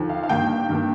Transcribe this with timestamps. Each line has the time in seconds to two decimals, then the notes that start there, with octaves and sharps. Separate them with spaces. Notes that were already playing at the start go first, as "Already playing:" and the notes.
Already playing: D#2 D3 F3
0.09 F5
0.23 F5
0.29 G2 D#3 A#3 G5
0.69 G2 D#3 A#3